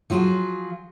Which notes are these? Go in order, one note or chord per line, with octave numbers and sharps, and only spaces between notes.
F3 F#3 F4 F#4 G#4